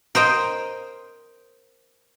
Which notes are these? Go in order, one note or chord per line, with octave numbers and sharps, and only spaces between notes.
A#4 C5 D#5 G5